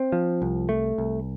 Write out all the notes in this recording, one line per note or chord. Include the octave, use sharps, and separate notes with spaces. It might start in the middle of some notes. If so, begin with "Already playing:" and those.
Already playing: C4
F3
C2
A3
C2